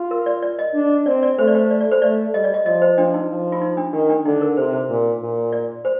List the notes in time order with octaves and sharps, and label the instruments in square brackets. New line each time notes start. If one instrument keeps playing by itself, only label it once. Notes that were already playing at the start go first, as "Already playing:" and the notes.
Already playing: [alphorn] F4
[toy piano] A#4
D5
D5
D#5
[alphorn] D4
[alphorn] C4 [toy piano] D5
[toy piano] D5
[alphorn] A3 [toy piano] C5
[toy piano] D5
C5
D5
D5
C5
[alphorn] A3 [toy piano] D5
[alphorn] G3 [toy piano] D#5
[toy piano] D5
D#5
[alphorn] F3 [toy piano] D#5
[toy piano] C5
[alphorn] F3 [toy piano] D4
[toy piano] D#4
[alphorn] F3
[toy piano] F4
D#4
D4
[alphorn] D#3 [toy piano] D4
[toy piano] D4
[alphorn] D3 [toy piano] D#4
[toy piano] A#4
[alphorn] C3 [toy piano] C5
[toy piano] C5
[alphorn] A#2
A#2
[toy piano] D5
C5